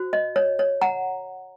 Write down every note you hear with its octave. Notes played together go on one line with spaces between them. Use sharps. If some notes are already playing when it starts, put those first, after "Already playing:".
Already playing: F#4 C5
D#5
C#5
C#5
F#5 A#5